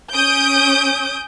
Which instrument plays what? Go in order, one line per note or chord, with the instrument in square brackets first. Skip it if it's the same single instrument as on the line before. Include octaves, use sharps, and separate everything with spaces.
[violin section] C#4 D#6 G6 D7